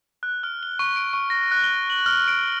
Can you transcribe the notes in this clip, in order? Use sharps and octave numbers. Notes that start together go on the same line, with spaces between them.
F#6
F6
G7
C#6
D7
C#6
A#6
F#6
G7
F#7
F6
D7